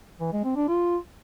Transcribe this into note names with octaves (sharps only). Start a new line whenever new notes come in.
E3
G#3
C4
D4
F4